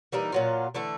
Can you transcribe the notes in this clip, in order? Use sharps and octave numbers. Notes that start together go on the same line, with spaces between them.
E3 G3 A#3 D#4
A#2 F#3 F4
D3 E3 A3